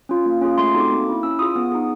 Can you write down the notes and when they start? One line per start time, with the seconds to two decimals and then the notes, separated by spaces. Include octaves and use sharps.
0.09 C#4 F4
0.26 A#3
0.41 C#4 F4 G#4
0.58 A3 C6
0.74 C4 D#4 F#4 A4
0.80 D6
0.91 A#3
1.07 C#4 E4
1.23 C#4 E6
1.39 F4 G#4 D#6
1.56 B3 D#6
1.72 D#4 G#4